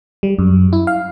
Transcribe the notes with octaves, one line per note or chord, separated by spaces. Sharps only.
G3
F#2
E4
F5